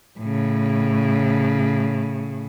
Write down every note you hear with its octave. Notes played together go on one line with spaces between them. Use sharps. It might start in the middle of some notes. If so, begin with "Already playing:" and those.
A2 C#3